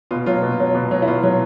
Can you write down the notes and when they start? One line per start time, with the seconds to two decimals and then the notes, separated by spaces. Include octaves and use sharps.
0.11 B2 F4
0.26 F#3 F4
0.42 B2
0.60 F#3
0.75 B2
0.91 F#3
1.02 E4
1.07 B2 F4
1.23 F#3